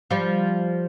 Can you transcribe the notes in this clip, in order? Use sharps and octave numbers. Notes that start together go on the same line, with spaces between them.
F3 G3